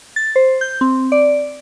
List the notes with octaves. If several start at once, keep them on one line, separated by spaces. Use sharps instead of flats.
A6
C5
G6
C4
D5